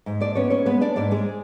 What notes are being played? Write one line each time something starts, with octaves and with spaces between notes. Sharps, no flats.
G#2
D4 D5
B3 C#4 C#5
C#4 C#5
G#3 B3 B4
D4 D5
G#2 D4 D5
G#3 G#4